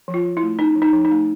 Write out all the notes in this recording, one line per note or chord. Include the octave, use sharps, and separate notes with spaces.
F3
F4
F3
E4
A3
C#4 D#4
F3
D#4
F3
D#4
A3